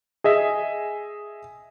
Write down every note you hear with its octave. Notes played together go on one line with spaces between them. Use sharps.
G#4 D#5 E5